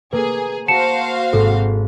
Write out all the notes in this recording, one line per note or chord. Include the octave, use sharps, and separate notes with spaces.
A#3 G#4 B4
F#4 C5 F5 A5 C#7 E7
G#1 A4